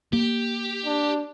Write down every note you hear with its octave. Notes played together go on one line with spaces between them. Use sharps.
A#3 G4
D4